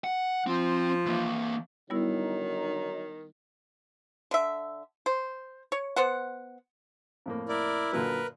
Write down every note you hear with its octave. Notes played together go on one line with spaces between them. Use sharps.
F#5
F3 C4
E3 A#3
D3 D#3 F#3 G3 B3 D#4 E4
D3 E5
C5
C#5
B3 C5 F#5
F2 A2 A#3
E4 A#4 D5
F#2 A#2 D3 A#4 B4